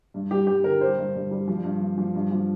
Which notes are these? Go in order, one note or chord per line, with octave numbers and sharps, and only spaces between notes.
G2
G3 G4
G2 G4
D3 A#4
G3 C5
G2
G2
G3
F3
G2
G2
F3
G2
F3